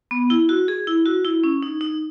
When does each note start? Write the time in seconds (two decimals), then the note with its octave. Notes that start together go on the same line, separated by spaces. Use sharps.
0.11 B3
0.30 E4
0.49 F#4
0.68 G#4
0.87 E4
1.06 F#4
1.25 E4
1.44 C#4
1.63 D#4
1.81 D#4